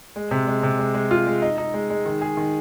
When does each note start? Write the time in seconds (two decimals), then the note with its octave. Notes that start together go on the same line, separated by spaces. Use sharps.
0.16 G#3
0.31 C3
0.47 G#3
0.63 C3
0.79 G#3
0.95 G#3
1.11 F4
1.27 G#3
1.42 D#4
1.58 D#4
1.74 G#3
1.90 G#3
2.06 D#3
2.21 G#4
2.37 D#3